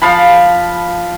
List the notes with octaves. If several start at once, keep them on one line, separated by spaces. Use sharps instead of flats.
F3 F5 A5 B5